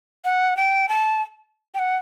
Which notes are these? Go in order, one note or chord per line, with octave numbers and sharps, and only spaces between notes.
F#5
G5
A5
G5
F#5